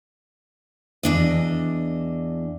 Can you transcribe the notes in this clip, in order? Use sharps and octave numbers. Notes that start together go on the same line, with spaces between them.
E2 D4 D#5